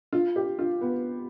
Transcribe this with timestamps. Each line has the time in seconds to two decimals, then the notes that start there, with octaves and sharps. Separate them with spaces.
0.13 F4
0.36 G4
0.59 F4
0.81 B3